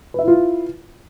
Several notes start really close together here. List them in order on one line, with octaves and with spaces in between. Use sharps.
B4 E5 E4 F4